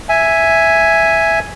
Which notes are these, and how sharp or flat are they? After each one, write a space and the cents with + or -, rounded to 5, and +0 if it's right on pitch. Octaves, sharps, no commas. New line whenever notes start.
E5 +0 G#5 +0